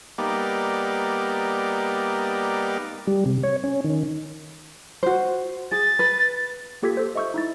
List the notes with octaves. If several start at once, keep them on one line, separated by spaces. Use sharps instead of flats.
G3 A#3 B3 D#4 G4 D5
G3
C3
C#5
C#4
D#3
F#4 C5
G#4 A6
B4
A#3 F4 G4 A4 G#6 B6
A4 C5
D#5 E5 C#6 E6 G6
D#4 E4 A6